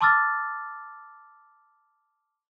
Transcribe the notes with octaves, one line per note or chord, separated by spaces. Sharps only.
A5 C6 D6 E6 F6 A6